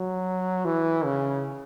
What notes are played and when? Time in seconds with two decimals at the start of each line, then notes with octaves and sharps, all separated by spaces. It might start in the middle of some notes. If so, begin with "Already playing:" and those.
Already playing: F#3
0.65 E3
1.05 C#3